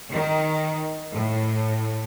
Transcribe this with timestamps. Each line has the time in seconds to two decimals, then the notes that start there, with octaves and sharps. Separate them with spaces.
0.11 D#3
1.12 A2